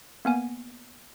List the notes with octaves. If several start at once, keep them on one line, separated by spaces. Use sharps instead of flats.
A#3 B3 G#5